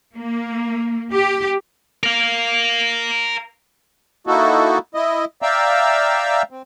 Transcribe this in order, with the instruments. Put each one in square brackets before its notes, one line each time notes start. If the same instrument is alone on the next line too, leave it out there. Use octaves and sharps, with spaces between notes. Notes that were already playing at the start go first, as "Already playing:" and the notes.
[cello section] A#3
G4
[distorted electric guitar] A#4 F5
[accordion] A#3 D#4 E4 F#4 A4
E4 D#5
D5 E5 F5 G5 A#5 E6
C4